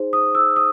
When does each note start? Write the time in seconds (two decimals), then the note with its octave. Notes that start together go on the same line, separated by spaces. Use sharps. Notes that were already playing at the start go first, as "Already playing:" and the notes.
Already playing: D#4 G#4 C5
0.13 D#6
0.35 E6
0.56 D#6